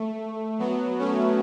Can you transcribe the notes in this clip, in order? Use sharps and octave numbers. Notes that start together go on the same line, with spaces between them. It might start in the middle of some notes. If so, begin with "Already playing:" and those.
Already playing: A3
F#3 B3
A3 C#4